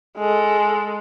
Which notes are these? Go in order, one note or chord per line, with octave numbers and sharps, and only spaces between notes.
G#3 A4